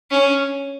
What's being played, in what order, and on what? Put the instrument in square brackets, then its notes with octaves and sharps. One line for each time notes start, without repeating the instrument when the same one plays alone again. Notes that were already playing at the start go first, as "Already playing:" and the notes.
[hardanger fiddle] C#4